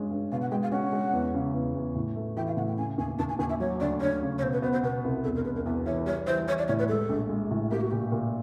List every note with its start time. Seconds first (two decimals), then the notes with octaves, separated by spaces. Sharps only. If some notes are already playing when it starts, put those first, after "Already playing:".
Already playing: G2 G#3 C#4
0.11 G2
0.32 B2 F5
0.41 F#5
0.51 G#3 G5
0.62 F5
0.72 C#4 F#5
0.93 G#3
1.13 E2
1.34 C#3
1.54 E2
1.76 E2
1.95 A2
2.16 A3
2.37 E3 G5
2.47 F5
2.57 A2 F#5
2.68 G5
2.78 C#3 G#5
2.98 D#2 G#5
3.19 D#2 A5
3.29 G#5
3.39 D#2 G#5
3.49 E5
3.60 F#3 C#5
3.80 D2 D5
4.01 D2 C#5
4.22 C#3
4.38 C#5
4.42 B2 C5
4.53 B4
4.62 B3 C5
4.73 C5
4.83 B2 B4
5.04 C2
5.24 E1 A4
5.35 A#4
5.45 E1 B4
5.56 A#4
5.66 E2 B4
5.86 E3 C#5
6.06 G3 C#5
6.27 E3 C5
6.47 E3 C#5
6.58 D5
6.68 A2 C#5
6.79 B4
6.89 G#3 A4
7.09 A#1
7.29 G#3
7.51 A2
7.71 A#3 G4
7.81 F#4
7.91 A#2 G4
8.12 A#2